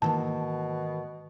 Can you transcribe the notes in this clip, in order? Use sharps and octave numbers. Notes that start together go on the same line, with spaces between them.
G#2 B2 D#3 E3 A#3 A5